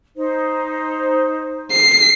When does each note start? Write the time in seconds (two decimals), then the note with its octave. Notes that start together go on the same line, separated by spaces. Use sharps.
0.16 D#4 C5
1.72 C7